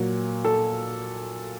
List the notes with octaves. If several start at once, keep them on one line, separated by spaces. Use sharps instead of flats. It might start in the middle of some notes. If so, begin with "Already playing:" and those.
Already playing: A#2 F#3
A4